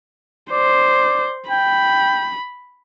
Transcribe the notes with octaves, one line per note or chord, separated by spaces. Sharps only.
C5 D5
G5 B5